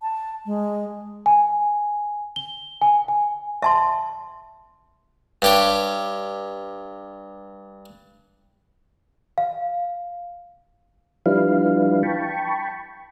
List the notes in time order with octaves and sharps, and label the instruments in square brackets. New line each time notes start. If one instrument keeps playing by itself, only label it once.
[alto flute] A5
G#3
[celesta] G#5
G7
G#5
G#5
[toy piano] E5 A5 C6
[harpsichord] G2 G4 C#5
[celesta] F5
[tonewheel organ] F3 G3 D4 E4 B4 F5
G5 A5 B5 C#6